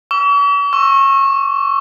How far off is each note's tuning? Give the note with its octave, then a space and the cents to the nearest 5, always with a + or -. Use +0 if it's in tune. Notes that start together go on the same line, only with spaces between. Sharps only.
C#6 +45 E6 +15
C#6 -25 E6 +10